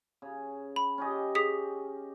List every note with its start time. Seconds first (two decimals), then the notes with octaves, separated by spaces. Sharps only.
0.22 C#3
0.76 B5
0.98 C#4 G4 D#5
1.35 G#4 D#6 B6